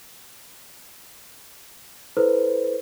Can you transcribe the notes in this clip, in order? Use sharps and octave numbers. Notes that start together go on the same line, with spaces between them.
E4 A4 B4 C5